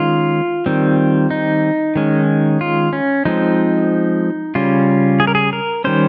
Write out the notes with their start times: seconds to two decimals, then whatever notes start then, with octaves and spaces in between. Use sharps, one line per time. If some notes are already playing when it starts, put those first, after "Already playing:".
Already playing: D#3 G#3 C#4 F4
0.66 D#3 G3 C4
1.30 D#4
1.95 D#3 G#3 C#4
2.61 F4
2.93 C#4
3.25 F3 G#3 C4 D#4
4.55 C#3 G3 C#4 F4
5.20 G#4
5.27 A#4
5.35 G#4
5.53 A#4
5.84 D#3 G3 C#4 C5